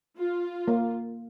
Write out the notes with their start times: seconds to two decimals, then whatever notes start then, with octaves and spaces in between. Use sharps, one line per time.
0.17 F4
0.68 A#3